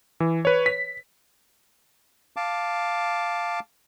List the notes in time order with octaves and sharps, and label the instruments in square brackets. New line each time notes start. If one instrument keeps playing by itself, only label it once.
[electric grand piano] E3
B4 C#5
B6
[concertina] F5 A5 D6